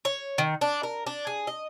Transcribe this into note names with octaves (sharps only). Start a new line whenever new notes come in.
C#5
D#3
D4
A#4
D4
G#4
D#5